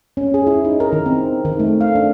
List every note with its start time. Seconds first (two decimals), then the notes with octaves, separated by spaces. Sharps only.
0.17 C#4
0.34 G#4
0.47 E4
0.65 D#4
0.80 A#4
0.93 D#3
1.06 C4
1.45 D#3
1.59 A3
1.81 F5
1.95 D4